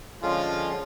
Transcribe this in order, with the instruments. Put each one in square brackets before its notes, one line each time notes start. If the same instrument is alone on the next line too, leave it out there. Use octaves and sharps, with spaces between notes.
[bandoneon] D3 G#3 C#4 [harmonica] F3 F4